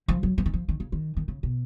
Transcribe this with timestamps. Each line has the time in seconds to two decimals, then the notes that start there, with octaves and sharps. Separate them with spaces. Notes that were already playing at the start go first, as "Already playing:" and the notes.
0.08 F3
0.23 F#3
0.38 F3
0.46 D#3
0.53 F3
0.69 D#3
0.80 C#3
0.92 D#3
1.17 D#3
1.28 C#3
1.43 B2